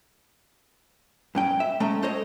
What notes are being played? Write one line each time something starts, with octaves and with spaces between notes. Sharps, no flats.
G2 C#4 G5
E5
G#3 A3 C#4 A#5
A4 C5 C#5 D#5